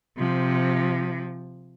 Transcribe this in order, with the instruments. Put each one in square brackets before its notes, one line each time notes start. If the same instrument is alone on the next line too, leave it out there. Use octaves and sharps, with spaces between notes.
[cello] C3 F3